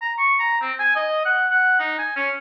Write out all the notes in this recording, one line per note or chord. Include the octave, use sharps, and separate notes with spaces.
A#5
C#6
A#5
C4
G#5
D#5
F#5
F#5
D#4
G#5
C#4